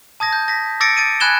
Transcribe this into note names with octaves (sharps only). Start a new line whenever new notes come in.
A5 D#6 G#6 A#6
G6
A#6 B6
D6 E6 A6 A#6 C#7 D7
A6 D7 D#7
G#5 B5 F#6 G#6 E7 G7